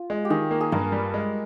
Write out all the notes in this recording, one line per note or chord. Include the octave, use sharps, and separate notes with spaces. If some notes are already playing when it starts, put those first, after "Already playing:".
Already playing: F4
G#3
G4
D#3 G#4
A#3
G#4
G2 A#4
G3
G#3